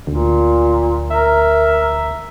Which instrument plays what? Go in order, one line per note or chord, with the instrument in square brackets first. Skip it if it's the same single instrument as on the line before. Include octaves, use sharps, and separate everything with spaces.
[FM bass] D2 [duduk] A#2
[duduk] A#4 [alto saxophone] E5